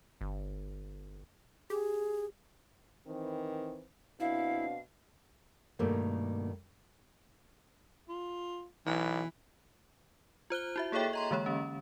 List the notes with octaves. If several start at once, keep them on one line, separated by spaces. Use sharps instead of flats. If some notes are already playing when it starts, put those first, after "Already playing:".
G1
G4 G#4
D#3 E3 C4
B2 C4 D4 E4 F5
G2 B2 D#3 A3 A#3
F4
B1 E3
F4 C5 F#6 G7
E4 F#4 E5
A#3 G#4 A4 C#5 E5 G5
D#5 A#5 C6
D3 E3 G#3 A#3 C#5
D3 C#4